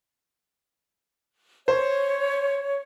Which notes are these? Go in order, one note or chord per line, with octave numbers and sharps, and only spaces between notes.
C5 C#5